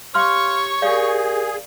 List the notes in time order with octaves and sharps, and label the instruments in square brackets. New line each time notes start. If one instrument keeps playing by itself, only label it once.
[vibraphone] G4 [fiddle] C#5 C#6 [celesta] F5 C6 F6
[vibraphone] G4 A#4 [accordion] G#4 [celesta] D5 F5